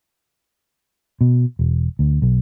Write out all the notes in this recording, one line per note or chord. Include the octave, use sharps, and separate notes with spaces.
B2
E1
D2
B1